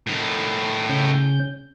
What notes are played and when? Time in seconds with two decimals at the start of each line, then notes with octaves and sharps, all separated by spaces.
0.07 A2 D#3
0.89 C#3 C#4 G6